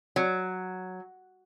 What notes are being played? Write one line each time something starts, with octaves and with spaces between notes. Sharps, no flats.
F#3